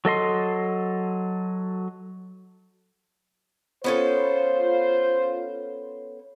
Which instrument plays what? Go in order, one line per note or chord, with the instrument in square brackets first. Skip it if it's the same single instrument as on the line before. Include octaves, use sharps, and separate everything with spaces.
[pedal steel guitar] F#3 A4 D#5 C6
[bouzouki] B3 C#4 A4 [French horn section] F4 C5